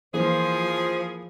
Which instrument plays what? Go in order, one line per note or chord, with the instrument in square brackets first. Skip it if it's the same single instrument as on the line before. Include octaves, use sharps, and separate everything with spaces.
[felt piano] E3 A#3 [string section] F3 [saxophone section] G#4 [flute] C5